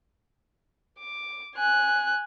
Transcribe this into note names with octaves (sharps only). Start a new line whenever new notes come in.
D6
G#5 F#6